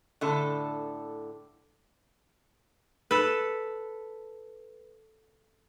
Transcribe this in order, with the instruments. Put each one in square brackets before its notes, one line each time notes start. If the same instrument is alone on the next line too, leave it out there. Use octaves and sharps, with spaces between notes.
[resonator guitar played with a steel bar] A2 D3 A4
[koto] A4 B4